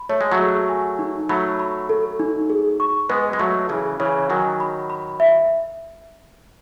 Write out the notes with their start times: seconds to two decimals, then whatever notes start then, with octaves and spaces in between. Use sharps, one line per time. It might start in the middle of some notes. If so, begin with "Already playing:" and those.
Already playing: B5
0.09 A3 C#5
0.21 G#3
0.32 F#3 A3
0.39 G#4
0.69 G#5
0.99 D#4
1.29 F#3 A3 B5
1.59 B5
1.89 A4
2.20 D#4
2.50 G#4
2.80 C#6
3.09 G#3 B3 B4
3.33 G#3
3.39 F#3 A3 C#6
3.69 C#3 E3 G#4
4.00 C#3 E3 C#5
4.30 D#3 F#3 G#5
4.60 B5
4.90 B5
5.20 E5